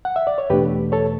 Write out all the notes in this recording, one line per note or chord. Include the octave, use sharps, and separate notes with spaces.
F#5
E5
D5
C#5
E2 B2 A3 D4 G4 B4
A4 C#5